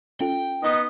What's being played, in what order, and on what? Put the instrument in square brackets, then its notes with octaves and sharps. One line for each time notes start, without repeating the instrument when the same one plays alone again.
[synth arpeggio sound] C#4 F4 A4 [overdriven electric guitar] G5
[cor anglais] B3 [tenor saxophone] D#4